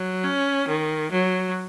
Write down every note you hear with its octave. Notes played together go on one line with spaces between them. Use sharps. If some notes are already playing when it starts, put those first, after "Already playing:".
Already playing: F#3
C#4
D#3
F#3